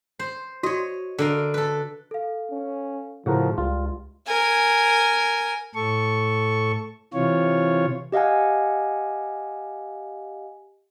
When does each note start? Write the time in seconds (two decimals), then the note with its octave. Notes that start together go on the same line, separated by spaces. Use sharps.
0.19 C5
0.63 F#4 C#5 D#5
1.18 D3 A#4 F5
1.54 A4 B4
2.11 A4 F5
2.51 C#4
3.26 A2 C#3 F3 F#4 G#4 A#4
3.58 C#2 G3 F4
4.26 A#4 G#5
5.75 A2 A4 C#6
7.13 C3 E3 F4 C#5
8.12 G4 D#5 F5 F#5 G#5